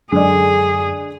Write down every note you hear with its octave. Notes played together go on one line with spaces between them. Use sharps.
F#2 D3 G#3 G#4 D5